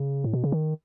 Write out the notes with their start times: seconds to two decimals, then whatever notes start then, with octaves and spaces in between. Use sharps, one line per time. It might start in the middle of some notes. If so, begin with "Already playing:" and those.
Already playing: C#3
0.24 A2
0.33 B2
0.44 C#3
0.52 D#3